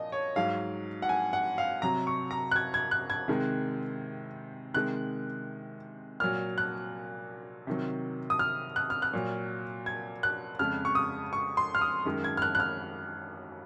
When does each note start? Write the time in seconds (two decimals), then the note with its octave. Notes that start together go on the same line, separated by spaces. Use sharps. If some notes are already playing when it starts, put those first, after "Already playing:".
Already playing: A#2 F3 D#5
0.12 C#5
0.36 G#2 F#3 F5
1.02 F#5
1.09 G#5
1.33 F#5
1.58 F5
1.82 C3 F#3 A#5
2.07 C#6
2.31 A#5
2.51 F#6
2.56 G#6
2.74 G#6
2.91 F#6
3.10 G#6
3.28 C3 D#3 G#3
4.74 C3 D#3 G#3 F#6
6.20 A#2 F#3 F6
6.58 F#6
7.67 C3 D#3 F#3
8.30 D#6
8.39 F6
8.76 F#6
8.90 F6
9.02 F#6
9.13 A#2 F#3
9.86 G#6
10.23 F#6
10.59 F2 C#3 G#3 F6
10.85 C#6
10.95 D#6
11.33 C#6
11.57 C6
11.75 F6
11.81 D#6
12.05 F#2 D#3 G#3
12.24 G#6
12.37 F6
12.42 F#6
12.55 F#6
12.60 F6